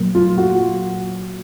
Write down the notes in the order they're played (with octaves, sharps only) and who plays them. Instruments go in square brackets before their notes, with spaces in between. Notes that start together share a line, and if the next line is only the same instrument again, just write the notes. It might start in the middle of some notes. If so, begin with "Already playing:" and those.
Already playing: [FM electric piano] A#2 F#3 A#3
[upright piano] F4
F#4